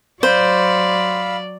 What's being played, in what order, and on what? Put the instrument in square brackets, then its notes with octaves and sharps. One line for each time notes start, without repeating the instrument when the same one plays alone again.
[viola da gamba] F#3 D5 [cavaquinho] C5 [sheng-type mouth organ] F5 B5 E6